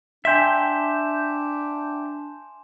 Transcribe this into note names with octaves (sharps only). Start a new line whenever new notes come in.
D4 E5 G5 G#5 C6 E7